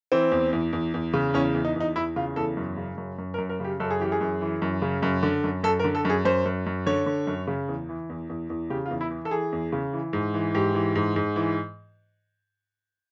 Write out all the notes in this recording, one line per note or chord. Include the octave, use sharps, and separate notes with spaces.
E3 C4
E2
E2
E2
E2
C#3
E2 C#4
E2
D#4
E2 D#4
E2 E4
C#3 F4
E2 A4
F#2
C#3
F#2
F#2
A#4
F#2
A#4
C#3 G4
F#2 A4
G#4
E3 G4
G#4
F#2
E3
F#2
C#3
F#2
D3
F#2
F#2 A4
A#4
D3
A4
F#2 G#4
F#2 C5
F#2
F#2
D3 C#5
D3
F#2
C#3
E2
E3
E2
E2
E2
C#3 G4
F4
E2
E4
E3
A4
E3 G#4
E2
C#3
E3
G#2
E3
G#2 G4
E3
G#2
G#2
E3